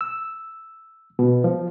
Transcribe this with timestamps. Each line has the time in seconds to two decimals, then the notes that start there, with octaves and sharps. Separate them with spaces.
0.01 E6
1.19 B2
1.44 F3